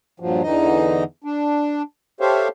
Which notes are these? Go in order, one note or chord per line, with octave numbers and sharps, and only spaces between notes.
G2 A#2 F3 F#3
E2 D3 E3 D#4 D#5
D4
G4 A4 C5 C#5 E5 F5